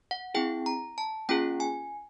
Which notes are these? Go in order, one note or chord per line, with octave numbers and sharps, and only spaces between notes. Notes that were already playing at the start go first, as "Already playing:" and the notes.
F#5
C4 E4 G#4 G5
A#5
A5
A#3 C#4 F4 G#4 G5
G#5